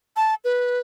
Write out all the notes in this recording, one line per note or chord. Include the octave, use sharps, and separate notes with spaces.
A5
B4